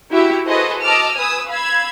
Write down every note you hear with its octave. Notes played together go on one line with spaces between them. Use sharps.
E4 F#4 G4 E5
F#4 G#4 A4 B4 C5 D#5
D#5 A5 D6 E6 F6
B4 G#5 D#6 E6
F5 B5 E6 G#6